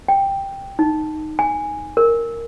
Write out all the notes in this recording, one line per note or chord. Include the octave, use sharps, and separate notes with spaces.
G5
D#4
G#5
A#4